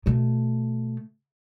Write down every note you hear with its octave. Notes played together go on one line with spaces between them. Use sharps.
B2 A3